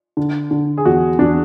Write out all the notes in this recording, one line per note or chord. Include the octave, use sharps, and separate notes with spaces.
D3
D3
G#4
E2 F#4
E2 D4